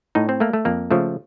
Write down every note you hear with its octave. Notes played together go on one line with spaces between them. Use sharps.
A2 D#4
C4
A3 A#3
A3
F2 A#3
C#3 F3 A3